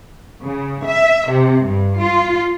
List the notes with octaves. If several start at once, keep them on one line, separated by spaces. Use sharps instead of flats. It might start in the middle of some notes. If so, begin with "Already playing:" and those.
C#3
E5
C3
G2
F4